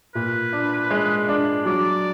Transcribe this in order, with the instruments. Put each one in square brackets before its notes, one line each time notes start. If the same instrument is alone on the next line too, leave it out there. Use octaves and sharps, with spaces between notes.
[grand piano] A#2 [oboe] B4
[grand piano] D4
G#3
D4
[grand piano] F#3 [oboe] D5